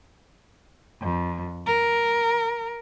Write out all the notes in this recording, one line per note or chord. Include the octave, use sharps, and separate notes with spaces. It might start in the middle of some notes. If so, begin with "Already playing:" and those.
F2
A#4